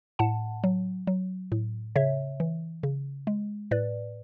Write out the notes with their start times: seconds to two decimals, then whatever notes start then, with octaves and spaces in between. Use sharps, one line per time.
0.19 A2 F#5 A5
0.64 F#3
1.07 F#3
1.52 A2
1.96 C#3 C#5 E5
2.40 E3
2.83 C#3
3.27 G#3
3.71 A2 B4 D5